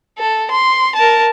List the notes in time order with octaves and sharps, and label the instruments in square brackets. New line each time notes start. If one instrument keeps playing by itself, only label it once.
[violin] A4
C6
A#4 A5